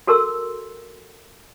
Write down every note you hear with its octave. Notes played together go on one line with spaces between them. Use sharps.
F#4 A4 A#4 A5 C6 E6